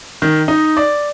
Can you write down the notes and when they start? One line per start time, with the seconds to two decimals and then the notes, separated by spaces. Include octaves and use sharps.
0.22 D#3
0.48 D#4
0.77 D5